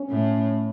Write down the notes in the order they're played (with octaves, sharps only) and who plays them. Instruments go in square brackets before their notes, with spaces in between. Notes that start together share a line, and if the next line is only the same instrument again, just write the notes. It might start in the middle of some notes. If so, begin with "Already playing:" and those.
Already playing: [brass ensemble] C#4
[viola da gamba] A2